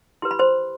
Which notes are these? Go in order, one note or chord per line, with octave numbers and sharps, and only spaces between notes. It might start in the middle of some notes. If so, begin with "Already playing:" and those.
E4 G4 B4 C6
B5
C5 C6